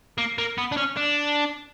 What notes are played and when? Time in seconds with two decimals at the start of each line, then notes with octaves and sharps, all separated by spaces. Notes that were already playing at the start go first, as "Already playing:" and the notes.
0.18 A#3
0.38 A#3
0.58 B3
0.72 D4
0.77 C#4
0.97 D4